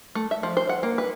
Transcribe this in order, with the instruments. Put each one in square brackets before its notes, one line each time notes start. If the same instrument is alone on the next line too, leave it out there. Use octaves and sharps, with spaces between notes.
[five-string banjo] A3
E5
F3
C5
F#5
A#3
B4